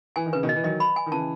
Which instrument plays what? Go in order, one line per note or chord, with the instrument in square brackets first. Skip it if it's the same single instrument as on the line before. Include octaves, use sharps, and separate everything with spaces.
[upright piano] E3 [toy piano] G#5
[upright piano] D#3
[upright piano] C#3 [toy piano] B4
[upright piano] B2 D#3
[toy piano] D#5
[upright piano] E3
[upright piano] D#3 F#3 [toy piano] D#5
[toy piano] B5
G#5
[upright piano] D#3
[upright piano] C#3 E3 [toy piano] A5